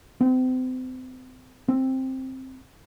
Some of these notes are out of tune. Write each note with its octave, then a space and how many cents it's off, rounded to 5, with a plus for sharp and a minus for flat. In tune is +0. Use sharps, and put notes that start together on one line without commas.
C4 -35
C4 +5